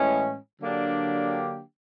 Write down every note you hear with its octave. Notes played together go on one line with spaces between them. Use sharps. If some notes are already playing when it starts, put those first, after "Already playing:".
Already playing: A2 E3 G#3 C#4
D3 F#3 A#3 D4 G4